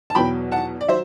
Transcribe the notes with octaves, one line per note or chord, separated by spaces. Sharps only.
A5
E2 B2 F#3 G5 B5
F#5 A5
D5
F#3 C5 E5